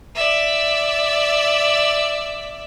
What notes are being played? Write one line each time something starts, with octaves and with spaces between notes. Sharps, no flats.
D5 E5